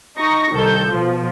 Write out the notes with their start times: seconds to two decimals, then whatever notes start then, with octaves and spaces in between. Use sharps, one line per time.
0.18 D#4 C#6 A#6
0.53 C2 D#3 A4 G6
0.90 B2 F3